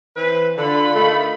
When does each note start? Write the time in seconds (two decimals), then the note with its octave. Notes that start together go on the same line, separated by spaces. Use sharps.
0.16 E3 C4 B4
0.57 D3 F4 B5
0.95 D3 D#3 A3